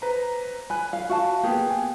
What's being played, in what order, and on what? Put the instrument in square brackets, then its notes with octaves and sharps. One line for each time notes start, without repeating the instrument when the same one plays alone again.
[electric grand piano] B4 C5 A#5
[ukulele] G#5 [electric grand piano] B5 F#6
[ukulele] F5
F#4 F5 A5
[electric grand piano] A#3 B3 [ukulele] G4 G#4
[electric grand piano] G#5